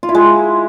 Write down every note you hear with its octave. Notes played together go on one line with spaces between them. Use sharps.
F4
E4
G#3